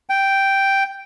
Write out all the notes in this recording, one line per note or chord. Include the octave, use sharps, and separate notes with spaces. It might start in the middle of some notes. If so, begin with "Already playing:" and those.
G5